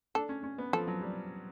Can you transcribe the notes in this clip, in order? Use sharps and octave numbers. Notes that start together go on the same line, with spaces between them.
D4 A4
C#4
C#4
B3
F3 A4
F#3
G3